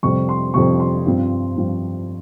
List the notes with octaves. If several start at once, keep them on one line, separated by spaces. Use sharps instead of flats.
F2 C3 G3 C#6
C6
F2 C3 G3 C#6
C6
G2 F3 C4 F4
G2 F3 C4 F4